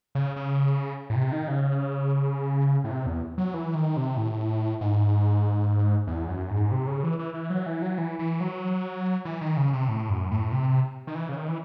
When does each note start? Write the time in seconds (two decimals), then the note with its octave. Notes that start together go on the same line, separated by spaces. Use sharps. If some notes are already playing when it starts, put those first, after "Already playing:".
0.15 C#3
0.36 C#3
1.10 A2
1.15 C3
1.32 D#3
1.48 C#3
2.84 A2
2.91 C3
3.06 E2
3.38 F#3
3.54 E3
3.75 D#3
3.97 C3
4.17 A2
4.81 G#2
6.07 E2
6.29 F#2
6.50 G#2
6.71 C3
6.87 C#3
7.03 E3
7.19 E3
7.34 E3
7.50 F#3
7.66 E3
7.82 F#3
7.98 E3
8.19 E3
8.40 F#3
9.25 E3
9.41 D#3
9.57 C#3
9.73 C3
9.88 A2
10.10 F#2
10.31 A2
10.52 C3
11.07 D#3
11.15 E3
11.29 C#3
11.37 D#3
11.48 E3